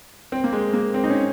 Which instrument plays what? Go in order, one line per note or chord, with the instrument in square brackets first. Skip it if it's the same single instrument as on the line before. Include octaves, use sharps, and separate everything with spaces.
[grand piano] C4
A#3
G#3
A#3
C4
D#4
C#4